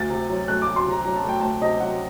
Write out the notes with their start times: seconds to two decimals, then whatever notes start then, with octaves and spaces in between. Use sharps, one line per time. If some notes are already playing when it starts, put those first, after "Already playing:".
Already playing: D2 A6
0.10 C3
0.29 F#3
0.48 A3 F#6
0.62 D6
0.67 D2
0.76 C6
0.86 C3 A#5
1.05 F#3 A#5
1.16 A5
1.24 A3
1.29 G5
1.41 D2 A5
1.61 C3 D#5
1.80 F#3 F#5